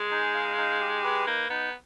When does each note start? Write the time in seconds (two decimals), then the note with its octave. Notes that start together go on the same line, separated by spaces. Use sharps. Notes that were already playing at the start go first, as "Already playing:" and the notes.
Already playing: G#3 G#4
0.11 D#4
0.34 F5
0.57 D#4
0.80 G4
1.04 B4
1.26 A#3 D#4
1.50 B3 D#4